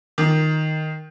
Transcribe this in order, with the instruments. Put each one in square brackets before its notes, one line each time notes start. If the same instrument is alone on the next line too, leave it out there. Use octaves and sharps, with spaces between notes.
[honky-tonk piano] D#3